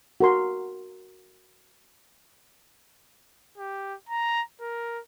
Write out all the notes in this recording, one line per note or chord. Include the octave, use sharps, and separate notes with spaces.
F#4 A#4 C6
G4
A#5
A#4